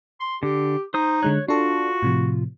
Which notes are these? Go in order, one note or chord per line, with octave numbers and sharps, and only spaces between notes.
C6
D3 G4
D#4 C5 D#6
D3 G#3 C#5 F#6
D4 F4 F#4 A4
A2 C3 F3